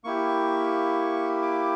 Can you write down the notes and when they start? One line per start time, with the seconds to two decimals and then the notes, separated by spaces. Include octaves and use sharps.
0.04 A#3 E4 G4 C#6
1.42 D6